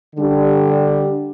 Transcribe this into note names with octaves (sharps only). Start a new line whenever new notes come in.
D3 G3 D4 G4